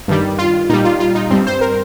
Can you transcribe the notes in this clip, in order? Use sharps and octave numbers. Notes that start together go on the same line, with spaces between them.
G2 D#3 G3
F4
A#2 G3 D#4
F4
F4
D#4
G2 G3 C4
C5
A#4